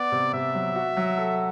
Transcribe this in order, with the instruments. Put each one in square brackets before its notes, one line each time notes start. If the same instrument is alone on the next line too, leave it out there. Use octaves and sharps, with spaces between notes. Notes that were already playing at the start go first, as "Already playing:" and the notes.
Already playing: [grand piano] B3 [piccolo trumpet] D5
[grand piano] C3
[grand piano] C3 [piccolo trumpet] E5
[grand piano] F#3
F#4
F#3
A4